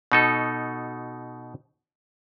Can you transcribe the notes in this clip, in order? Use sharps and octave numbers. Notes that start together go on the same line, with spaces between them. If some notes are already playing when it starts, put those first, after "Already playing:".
B2 D#4 A4